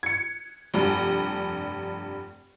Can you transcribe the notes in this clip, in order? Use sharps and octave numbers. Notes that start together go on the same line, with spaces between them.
G#6 C#7
F1 G2